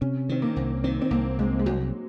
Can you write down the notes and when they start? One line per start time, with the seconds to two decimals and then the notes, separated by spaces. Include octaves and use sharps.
0.01 C3 C#4
0.29 D#3 C4
0.42 A#3
0.56 C2
0.84 D#3 C4
1.02 C4
1.11 C2 A#3
1.39 C2 G#3
1.59 G#3
1.66 C2 F#3